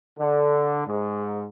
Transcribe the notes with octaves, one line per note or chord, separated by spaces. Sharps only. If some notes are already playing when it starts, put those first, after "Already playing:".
D3
G#2